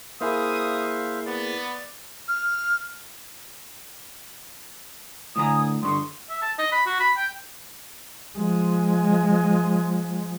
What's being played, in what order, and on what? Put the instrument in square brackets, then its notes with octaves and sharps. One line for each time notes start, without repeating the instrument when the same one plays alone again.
[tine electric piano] A#3 E4 G#4 [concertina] C5 E5 F5 [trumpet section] D#6
[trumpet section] B3 [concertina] D5
[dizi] F6
[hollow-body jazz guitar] A2 D3 A#5 [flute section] G#5 D#6
[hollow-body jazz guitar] G2 D3 [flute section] C6 C#6 D#6
[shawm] E5
A5
D#5
B5
F#4
B5
G5
[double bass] F3 G#3